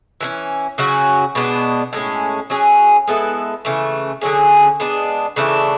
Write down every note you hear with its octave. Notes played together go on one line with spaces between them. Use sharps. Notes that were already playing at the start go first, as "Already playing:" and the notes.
E3 A3 C#4
C#3 F#3 C#4 F#4
B2 G#3 B3 D4
A2 G#3 C#4
F#3 C#4 G#4
G#3 B3 E4 A4
C#3 E3 A3
D3 F#3 C#4 G#4
G#3 B3 D4
C#3 E3 A3 D4